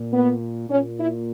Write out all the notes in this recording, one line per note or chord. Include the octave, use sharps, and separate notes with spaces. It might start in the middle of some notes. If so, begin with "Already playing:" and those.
Already playing: A#2
B3
A#2 C#4
E4